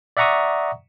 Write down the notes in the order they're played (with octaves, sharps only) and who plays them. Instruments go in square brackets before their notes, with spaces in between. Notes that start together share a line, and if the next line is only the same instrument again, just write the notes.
[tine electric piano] D5 E5 F#5 A#5 C#6 D#6